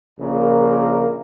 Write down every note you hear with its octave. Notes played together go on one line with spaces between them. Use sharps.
A#1 C#3 A#3 A#4